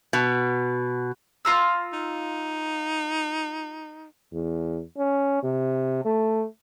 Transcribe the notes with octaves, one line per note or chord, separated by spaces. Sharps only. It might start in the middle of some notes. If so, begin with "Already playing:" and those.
B2
F4 A#5 E6
D#4
E2
C#4
C3
A3